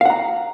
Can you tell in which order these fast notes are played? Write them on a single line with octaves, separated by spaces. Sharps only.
F5 F#5 A#5